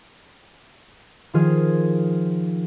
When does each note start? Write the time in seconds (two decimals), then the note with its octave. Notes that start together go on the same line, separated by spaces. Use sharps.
1.34 D#3 F3 F4 G#4 F6